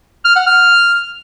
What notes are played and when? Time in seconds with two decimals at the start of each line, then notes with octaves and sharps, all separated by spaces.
0.25 F6
0.36 F#5
0.47 F6